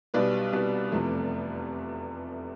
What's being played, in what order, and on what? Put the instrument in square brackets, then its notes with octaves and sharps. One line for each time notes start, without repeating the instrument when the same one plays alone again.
[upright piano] B1 B2 G3 B4 D5
C2 B2 G3
F1 E2 C3 F3 A3